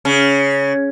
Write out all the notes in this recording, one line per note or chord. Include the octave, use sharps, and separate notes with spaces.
C#3